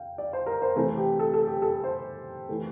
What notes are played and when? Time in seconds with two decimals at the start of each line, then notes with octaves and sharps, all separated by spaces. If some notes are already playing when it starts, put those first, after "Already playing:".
Already playing: F5 G5
0.18 D5
0.33 C5
0.46 A#4
0.62 C5
0.76 C3 E3 A3 C5
0.97 G4
1.19 A4
1.34 A4
1.47 G4
1.62 A4
1.84 C5
2.49 E3 A3